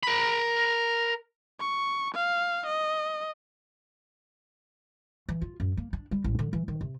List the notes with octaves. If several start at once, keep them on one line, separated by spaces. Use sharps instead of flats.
A#4 B5
C#6
F5
D#5
E3
F4
F#2
A#3
D4
G3
A1
D3
E3
D#3
C3